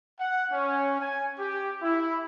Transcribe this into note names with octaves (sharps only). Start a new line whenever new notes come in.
F#5
C#4
G#5
G4
E4